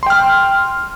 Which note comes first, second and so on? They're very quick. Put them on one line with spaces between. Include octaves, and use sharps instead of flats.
C6 G5 F6